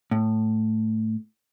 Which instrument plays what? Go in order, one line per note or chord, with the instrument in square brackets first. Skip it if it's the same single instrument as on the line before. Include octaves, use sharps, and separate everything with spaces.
[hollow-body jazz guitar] A2